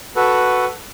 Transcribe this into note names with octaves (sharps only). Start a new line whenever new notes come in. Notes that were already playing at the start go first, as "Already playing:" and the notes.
F#4 A4 B4